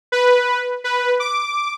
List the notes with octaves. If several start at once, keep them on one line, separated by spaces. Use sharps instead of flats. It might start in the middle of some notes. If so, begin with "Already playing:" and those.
B4
B4
D6